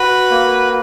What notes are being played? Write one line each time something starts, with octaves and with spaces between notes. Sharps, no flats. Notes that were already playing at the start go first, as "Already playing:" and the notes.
Already playing: F#4 B4
A#3